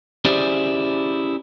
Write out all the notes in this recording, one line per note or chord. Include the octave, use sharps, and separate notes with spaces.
C#4 E4 G4 G#4 C5 D5